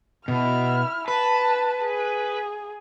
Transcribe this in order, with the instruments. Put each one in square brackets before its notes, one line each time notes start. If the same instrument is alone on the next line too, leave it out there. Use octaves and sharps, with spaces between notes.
[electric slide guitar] B2 [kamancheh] E4 F6
[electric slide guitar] B4 [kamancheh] A5
[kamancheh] G#4